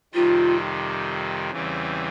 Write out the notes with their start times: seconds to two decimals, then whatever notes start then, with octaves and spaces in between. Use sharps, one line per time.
0.14 F2 C3 D#3 G3 F4
1.51 E2 C#3 E3 G3 C4